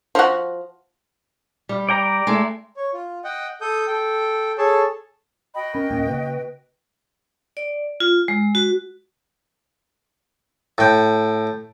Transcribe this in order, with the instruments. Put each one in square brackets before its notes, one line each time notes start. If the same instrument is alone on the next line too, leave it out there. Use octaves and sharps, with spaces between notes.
[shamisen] F3 F#4
[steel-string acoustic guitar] G3
[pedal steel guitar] D5 G5 A#5
[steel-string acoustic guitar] G#3 A3 E4
[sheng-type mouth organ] C#5
F4
D#5 F#5 G5
A4 D#6 G6
A4 G5
G#4 A4 C#5 A5
[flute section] F#4 D#5 G5 [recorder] B5
[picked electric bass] C#4 [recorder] A#4
[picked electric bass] D1 A#3 C#4
[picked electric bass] C#3 A#3 [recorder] B4
[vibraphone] D5
F4
G#3
F#4
[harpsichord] A2 G5